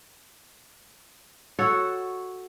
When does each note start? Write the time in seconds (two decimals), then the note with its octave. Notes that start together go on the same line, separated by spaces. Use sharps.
1.59 F#4 A4 C#5